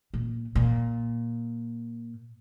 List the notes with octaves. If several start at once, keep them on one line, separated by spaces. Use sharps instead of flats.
A#2
A#2